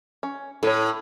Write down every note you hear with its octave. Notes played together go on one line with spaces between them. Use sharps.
C#4
A2 A4 C#5